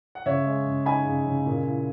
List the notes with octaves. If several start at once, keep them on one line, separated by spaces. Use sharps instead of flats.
F#5
C#3 C#5 E5
G#3
C#3
D#4 G#5 B5
C#3
C#3
A#2
E4